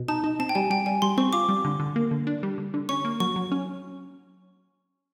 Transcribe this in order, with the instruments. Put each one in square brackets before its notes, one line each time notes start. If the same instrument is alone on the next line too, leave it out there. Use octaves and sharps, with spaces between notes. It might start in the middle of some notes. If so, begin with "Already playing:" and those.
Already playing: [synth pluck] B2
[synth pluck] D#4 [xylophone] A5
[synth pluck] D#4
[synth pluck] C4 [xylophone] A5
[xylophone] G5
[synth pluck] G3 [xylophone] G#5
[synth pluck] G3 [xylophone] G5
[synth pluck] G3 [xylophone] G#5
[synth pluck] G3 [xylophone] C6
[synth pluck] C4 [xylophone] C#6
[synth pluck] F4 [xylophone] D6
[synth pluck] G3
D3
D3
A#3
D3
D4
G3
D3
D3
[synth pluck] C#4 [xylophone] C#6
[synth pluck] A#3
[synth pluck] F#3 [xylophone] C#6
[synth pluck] F#3
C#4